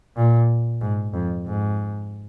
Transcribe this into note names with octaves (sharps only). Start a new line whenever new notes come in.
A#2
G#2
F2
G#2